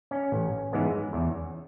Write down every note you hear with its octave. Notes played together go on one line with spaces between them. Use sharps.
C#4
A1
G#2 E3 G#3 B3
E2